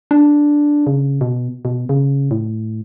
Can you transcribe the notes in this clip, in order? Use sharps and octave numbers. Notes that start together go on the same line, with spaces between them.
D4
C#3
B2
B2
C#3
A2